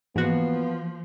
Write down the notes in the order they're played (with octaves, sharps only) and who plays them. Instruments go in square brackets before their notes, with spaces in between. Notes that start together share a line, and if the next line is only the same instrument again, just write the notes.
[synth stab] G#2 F#4 [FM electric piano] E3 A#3 [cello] F3 [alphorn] B3